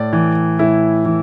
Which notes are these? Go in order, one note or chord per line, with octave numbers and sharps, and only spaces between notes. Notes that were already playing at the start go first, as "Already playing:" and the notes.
Already playing: A2 D5
E3
A2 E4
E3